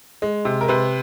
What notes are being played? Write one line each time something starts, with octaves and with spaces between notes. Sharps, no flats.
G#3
C3
A#4
C3 B4